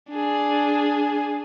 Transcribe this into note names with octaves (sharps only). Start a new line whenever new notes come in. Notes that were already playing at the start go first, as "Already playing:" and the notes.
D4 G#4